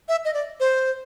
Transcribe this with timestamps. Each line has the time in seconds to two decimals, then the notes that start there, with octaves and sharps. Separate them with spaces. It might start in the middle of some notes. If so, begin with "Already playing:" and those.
0.09 E5
0.25 D#5
0.34 D5
0.60 C5